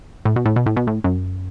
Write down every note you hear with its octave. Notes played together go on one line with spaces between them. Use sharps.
A2
B2
A2
B2
A2
B2
A2
F#2